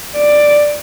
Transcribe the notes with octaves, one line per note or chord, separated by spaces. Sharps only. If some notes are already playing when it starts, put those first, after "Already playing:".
D5